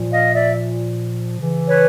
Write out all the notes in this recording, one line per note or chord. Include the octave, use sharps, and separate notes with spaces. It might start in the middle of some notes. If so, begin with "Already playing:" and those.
Already playing: A#2 F3
D#5 F5
D5 E5
C#3 E3
B4 C#5